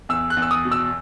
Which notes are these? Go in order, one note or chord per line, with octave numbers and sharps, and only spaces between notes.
E2 E6
F#6
E2
E6
D#6
B2
E6